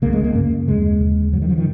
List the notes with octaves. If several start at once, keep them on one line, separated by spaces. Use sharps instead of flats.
C#2 C#3 A#3
G#3
A#3
F#2 C#3 A#3
D#2 C#3 G#3
D#2 C#3
F#2 C#3 F#3
D#3
F3
D#3